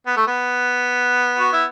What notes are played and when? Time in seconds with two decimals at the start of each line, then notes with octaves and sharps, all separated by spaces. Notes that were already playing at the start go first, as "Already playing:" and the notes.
0.07 B3
0.17 A3
0.27 B3
1.39 F#4
1.53 E4